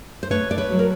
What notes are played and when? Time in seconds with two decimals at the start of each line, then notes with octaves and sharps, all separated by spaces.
0.23 C5
0.30 A3 B4 C#5
0.51 D5
0.58 B4 C#5
0.72 F#3
0.79 A#4